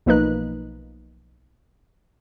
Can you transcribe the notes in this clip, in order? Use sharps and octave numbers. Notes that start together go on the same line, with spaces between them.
B1 F3 A#3 D#4 B4 F#6